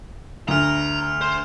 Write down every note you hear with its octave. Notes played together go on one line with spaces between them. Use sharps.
D2 A#5 F6 F7
C5